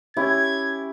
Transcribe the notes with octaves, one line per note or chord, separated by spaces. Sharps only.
C#4 E4 G4 G#6